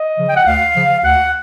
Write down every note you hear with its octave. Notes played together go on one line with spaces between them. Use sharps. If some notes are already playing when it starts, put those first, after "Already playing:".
Already playing: D#5
C#3 F3
G5
F#5
D2 F5
C#3 F3
D2 F#5